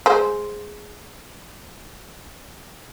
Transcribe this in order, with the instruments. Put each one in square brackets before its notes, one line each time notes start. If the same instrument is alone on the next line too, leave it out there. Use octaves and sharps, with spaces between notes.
[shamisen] G#3 C5